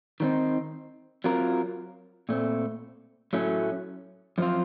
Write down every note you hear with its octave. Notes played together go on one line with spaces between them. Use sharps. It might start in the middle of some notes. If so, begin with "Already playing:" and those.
D#3 F#3 C4 D#4
F#3 C4 F4 A#4
A#2 A3 C4
A2 F#3 A3 C#4
F#2 F3 C4 F4